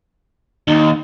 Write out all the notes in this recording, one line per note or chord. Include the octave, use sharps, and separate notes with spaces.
D#2 D#4